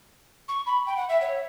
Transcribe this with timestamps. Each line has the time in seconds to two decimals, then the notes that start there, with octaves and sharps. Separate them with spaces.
0.48 C#6
0.66 B5
0.86 G5
0.96 F#5
1.09 E5
1.21 C#5